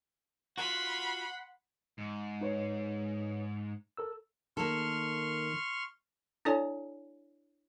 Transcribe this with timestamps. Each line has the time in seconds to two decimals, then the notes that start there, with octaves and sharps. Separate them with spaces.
0.58 F4 F#4 F#5 B5 C6
1.98 G#2
2.41 D#4 B4 C#5
3.97 A4 A#4 E6
4.57 D#3 A#3 A4 C6 C#6 F6
6.45 D4 E4 A4 C#5 D5 G#5